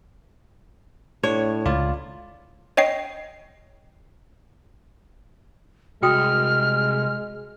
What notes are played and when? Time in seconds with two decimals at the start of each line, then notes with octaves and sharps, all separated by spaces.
1.23 A2 D4 C#5
1.66 C#2 F4 D5
2.77 C#5 D#5 G5 C7
6.02 C2 G#3 F#4 G5 D#6 F6